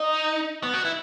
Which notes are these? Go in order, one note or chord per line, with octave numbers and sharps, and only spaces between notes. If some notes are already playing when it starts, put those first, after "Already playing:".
Already playing: D#4
B3
F#4
E4